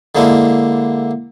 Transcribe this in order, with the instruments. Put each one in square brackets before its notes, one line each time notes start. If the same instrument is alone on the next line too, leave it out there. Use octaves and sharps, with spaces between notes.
[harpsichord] D3 G#3 A#3 D4 E4